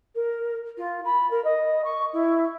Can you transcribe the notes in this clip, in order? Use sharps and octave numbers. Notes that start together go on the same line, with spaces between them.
A#4
F4
B5
A#4
D#5
C#6
E4